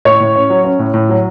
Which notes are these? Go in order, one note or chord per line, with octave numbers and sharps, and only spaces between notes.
A2 C#5
A2
C#4
F#3
C#4
A2
A2
F#3